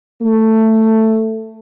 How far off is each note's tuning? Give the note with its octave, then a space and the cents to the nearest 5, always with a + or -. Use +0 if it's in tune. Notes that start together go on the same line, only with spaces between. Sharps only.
A3 +10